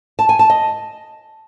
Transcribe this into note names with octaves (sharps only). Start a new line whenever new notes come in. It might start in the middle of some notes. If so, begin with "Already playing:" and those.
A5
G#5
A5
D#5